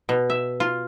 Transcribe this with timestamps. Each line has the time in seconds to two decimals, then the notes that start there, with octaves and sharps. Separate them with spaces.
0.09 B2
0.30 E5
0.60 F4